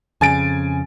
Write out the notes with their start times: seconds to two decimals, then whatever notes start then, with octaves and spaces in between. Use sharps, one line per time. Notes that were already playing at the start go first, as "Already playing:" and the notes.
0.21 F2 C#3 G#5 A6 D7